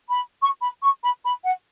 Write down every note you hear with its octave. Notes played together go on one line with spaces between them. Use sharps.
B5
C#6
B5
C#6
B5
B5
F#5